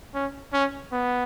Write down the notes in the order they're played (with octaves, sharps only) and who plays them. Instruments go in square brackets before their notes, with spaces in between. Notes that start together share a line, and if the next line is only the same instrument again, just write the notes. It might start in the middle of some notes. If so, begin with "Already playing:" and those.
[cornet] C#4
C#4
B3